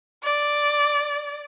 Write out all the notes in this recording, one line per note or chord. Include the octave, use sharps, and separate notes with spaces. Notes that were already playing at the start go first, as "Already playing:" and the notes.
D5